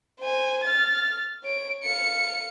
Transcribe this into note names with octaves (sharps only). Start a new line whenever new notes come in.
C5 G#5
F6 A6
C#5 D7
F5 C#7